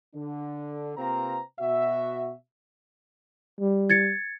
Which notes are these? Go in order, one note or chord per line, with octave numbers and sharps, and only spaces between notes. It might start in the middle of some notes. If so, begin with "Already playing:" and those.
D3 D4
C3 A#3 C4 F4 B4 A#5
B2 F#4 E5
G3
G#6 A6 C#7